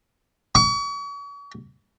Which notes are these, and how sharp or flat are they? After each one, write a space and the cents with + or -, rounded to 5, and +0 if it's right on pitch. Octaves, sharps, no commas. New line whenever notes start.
C#6 +40